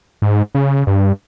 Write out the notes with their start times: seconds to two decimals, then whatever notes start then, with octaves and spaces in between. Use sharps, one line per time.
0.22 G#2
0.55 C#3
0.87 G2